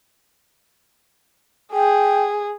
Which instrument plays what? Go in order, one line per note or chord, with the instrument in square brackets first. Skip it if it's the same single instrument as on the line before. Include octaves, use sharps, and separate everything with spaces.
[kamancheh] G#4 [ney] G5